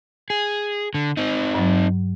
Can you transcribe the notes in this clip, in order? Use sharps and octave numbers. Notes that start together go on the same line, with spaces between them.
G#4
D3
C4 D#4
G2 F#3